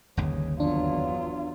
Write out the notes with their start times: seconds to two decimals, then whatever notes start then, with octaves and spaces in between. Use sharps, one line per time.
0.17 G1 D#2 C#3
0.60 E2 F#3 D4 F4